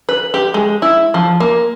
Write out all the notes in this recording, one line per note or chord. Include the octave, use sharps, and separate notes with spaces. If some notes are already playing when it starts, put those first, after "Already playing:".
B4
G4
G#3
E4
F3
A#3